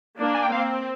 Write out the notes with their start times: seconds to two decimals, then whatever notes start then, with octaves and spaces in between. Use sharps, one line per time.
0.20 A#3 D4
0.35 G#5
0.43 G5
0.52 C4 F5